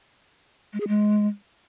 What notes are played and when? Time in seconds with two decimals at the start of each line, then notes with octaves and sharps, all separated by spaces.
0.73 G#3
0.80 G#4
0.88 G#3